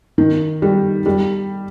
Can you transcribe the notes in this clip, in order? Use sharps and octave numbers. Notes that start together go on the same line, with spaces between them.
D#3
G3
G3